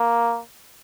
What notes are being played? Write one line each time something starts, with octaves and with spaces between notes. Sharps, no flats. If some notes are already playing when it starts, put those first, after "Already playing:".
Already playing: A#3